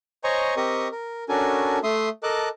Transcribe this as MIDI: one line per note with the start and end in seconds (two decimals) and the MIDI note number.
0.24 0.54 72
0.24 0.54 73
0.24 0.54 75
0.24 0.54 80
0.24 0.54 82
0.24 0.54 85
0.57 0.88 60
0.57 0.88 67
0.57 0.88 70
0.57 0.88 75
0.57 0.88 85
0.57 0.88 87
0.92 1.24 70
1.29 1.79 61
1.29 1.79 62
1.29 1.79 66
1.29 1.79 69
1.29 1.79 70
1.29 1.79 80
1.83 2.09 57
1.83 2.09 76
1.83 2.09 84
1.83 2.09 87
2.23 2.49 69
2.23 2.49 70
2.23 2.49 75
2.23 2.49 81
2.23 2.49 86
2.23 2.49 90